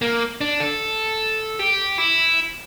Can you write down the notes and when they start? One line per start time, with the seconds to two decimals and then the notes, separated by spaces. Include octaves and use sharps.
0.02 A#3
0.41 D4
0.60 A4
1.59 G4
1.98 E4